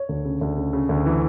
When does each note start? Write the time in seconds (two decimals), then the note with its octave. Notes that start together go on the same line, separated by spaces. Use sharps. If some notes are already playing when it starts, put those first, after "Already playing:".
Already playing: C#5
0.09 D2
0.25 C#3
0.41 D2
0.57 C#3
0.73 C#3
0.89 D2
1.06 E3